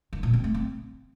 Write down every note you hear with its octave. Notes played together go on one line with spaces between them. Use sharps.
D#3
A#2
C4
A3
C4